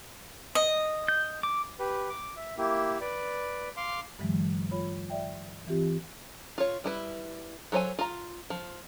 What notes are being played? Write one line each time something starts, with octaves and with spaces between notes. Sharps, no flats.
D#5
G6
D6
G4 B4
D6
E5
A#3 E4 G4
B4 D5
F5 C6 D6
G2 D3 E3 F#3 G#3
F4 C#5 B5
D5 E5 G5
E3 C4 F4 G4
F4 C#5
G3 E4 B4
F#3 A4 C5 C#5 G#5
F4 A#5
F3